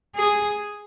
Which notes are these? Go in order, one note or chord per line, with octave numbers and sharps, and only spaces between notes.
G#4